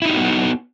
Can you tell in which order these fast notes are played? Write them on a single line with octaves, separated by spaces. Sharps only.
E4 D#4 G4 F#4 B3